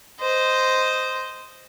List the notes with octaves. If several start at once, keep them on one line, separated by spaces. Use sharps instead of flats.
C5 D#5